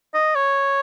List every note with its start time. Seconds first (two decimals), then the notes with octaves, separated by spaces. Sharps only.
0.14 D#5
0.35 C#5